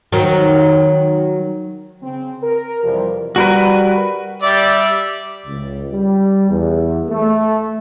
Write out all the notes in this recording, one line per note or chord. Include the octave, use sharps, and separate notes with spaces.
D#3 F#3
C#3 C4
A#4
F2 C3 E3 F3 G3
G3 F#4 A#4 B4
G3 D5 E5
C#2
G3
E2
A3